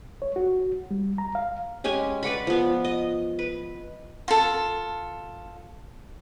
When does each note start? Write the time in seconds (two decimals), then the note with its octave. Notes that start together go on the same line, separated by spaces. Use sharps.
0.22 C#5
0.36 F#4
0.91 G3
1.18 A#5
1.35 F5
1.84 G#3 C#4 G4 G#5
2.23 B4 D5 F#5 B5
2.47 F3 B3
2.84 D#5
3.39 B4
4.28 F4 A4